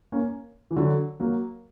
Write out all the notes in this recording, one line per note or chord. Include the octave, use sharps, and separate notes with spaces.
A#3 C#4
E3
D3 F#3
F#3 A#3